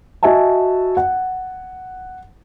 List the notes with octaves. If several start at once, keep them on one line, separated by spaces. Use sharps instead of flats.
F#4 D#5 E5 G#5 A5
F#5